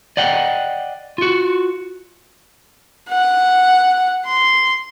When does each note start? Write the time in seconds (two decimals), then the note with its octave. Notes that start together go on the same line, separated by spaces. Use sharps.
0.17 D5 D#5 F#5 G5
1.18 F4 F#4
3.10 F#5
4.26 C6